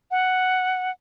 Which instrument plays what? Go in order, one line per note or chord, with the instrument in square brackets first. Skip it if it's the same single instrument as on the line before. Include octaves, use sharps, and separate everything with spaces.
[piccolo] F#5